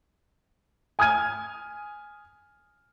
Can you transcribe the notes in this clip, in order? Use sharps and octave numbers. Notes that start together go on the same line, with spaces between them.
G#5 D#6 F6 G#6 D#7